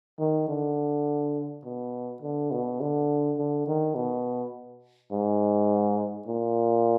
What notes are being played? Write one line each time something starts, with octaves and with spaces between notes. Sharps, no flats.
D#3
D3
B2
D3
B2
D3
D3
D#3
B2
G#2
A#2